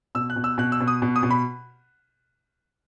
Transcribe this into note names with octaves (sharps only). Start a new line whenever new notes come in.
B2 E6
F#6
B2
E6
B2 F#6
E6
B2
D#6
B2
D#6
B2
B5